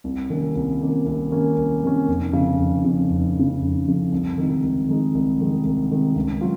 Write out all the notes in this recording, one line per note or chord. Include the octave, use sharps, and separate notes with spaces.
C2
C3 D#3 A#3 C#4
C2
C3 D#3 A#3 C#4
C2
C3 D#3 A#3 C#4
C2
C3 D#3 A#3 C#4
F1
F2 C#3
F1
F2 C#3
F1
F2 C#3
F1
F2 C#3
C2
C3 D#3 G#3 D#4
C2
C3 D#3 G#3 D#4
C2
C3 D#3 G#3 D#4
C2
C3 D#3 G#3 D#4
C#2
F#3 F4